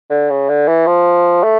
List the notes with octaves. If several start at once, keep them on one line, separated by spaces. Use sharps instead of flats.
D3
C#3
D3
E3
F3
A3